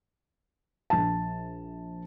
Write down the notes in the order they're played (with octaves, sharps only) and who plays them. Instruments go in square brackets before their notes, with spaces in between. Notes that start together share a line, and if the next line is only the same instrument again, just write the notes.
[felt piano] A#1 A5